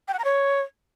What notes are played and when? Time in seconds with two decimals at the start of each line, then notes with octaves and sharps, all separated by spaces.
0.08 G5
0.13 F#5
0.19 A#5
0.24 C#5